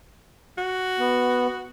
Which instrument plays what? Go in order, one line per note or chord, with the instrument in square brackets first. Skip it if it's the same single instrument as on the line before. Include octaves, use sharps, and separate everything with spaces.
[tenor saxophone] F#4
[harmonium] B3